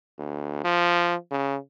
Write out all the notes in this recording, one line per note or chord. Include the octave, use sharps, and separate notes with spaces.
D2
F3
C#3